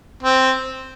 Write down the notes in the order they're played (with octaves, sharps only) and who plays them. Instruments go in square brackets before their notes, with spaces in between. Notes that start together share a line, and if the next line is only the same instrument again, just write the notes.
[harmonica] C4